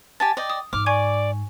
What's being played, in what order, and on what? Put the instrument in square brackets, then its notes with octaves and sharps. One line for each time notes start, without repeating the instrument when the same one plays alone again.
[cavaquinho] G4 G#5 A5 [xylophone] A6
[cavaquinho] D5 D#5 G5
[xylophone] D#6
[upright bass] G#2 [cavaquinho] D6 [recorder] F6
[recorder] D5 [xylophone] G#5 C#6 G#6